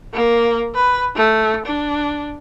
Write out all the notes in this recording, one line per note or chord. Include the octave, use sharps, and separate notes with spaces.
A#3
B4
A3
D4